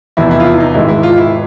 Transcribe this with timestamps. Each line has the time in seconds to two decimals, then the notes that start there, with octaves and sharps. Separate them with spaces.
0.17 F1 E2 B2 E4
0.31 E4
0.40 F4
0.45 E4
0.60 D#4
0.74 G#1 G#2 E3 G#3 E4
0.89 E4
1.03 F4
1.17 E4